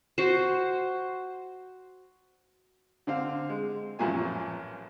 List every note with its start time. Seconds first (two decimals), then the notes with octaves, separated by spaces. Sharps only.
0.18 F#4 C5
3.07 D3 C4 F5
3.49 G#3
3.99 A1 F#2 A#2 F3 A#3 G#5